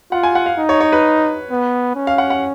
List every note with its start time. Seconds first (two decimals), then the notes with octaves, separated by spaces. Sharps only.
0.12 F4 F#5
0.23 G#5
0.35 F#5
0.46 F5
0.58 D#4
0.69 C#5
0.81 C#5
0.93 B4
1.50 B3
1.96 C#4
2.07 F5
2.18 F#5
2.30 F#5